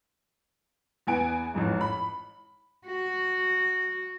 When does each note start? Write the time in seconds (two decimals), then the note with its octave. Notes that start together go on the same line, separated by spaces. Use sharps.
1.07 E2 B3 G#5 D7
1.54 A1 F2 G#2
1.81 B5
2.86 F#4